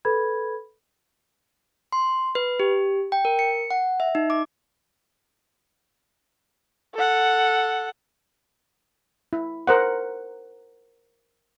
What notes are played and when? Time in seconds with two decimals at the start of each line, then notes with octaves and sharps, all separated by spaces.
0.05 A4 B4 B5 G#6
1.92 C6
2.35 B4
2.60 G4
3.12 G5
3.25 A#4
3.39 C#7
3.71 F#5
4.00 E5
4.15 D#4
4.30 D6
6.95 A4 F#5
9.33 E4
9.67 A#4 C5 F#5